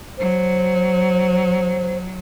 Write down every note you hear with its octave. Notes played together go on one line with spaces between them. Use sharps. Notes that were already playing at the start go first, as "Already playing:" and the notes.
F#3 C5